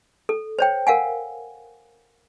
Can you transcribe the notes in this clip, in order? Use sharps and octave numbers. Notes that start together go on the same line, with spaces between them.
A4
C5 C#5 G5
A#4 F5 F#5 G#5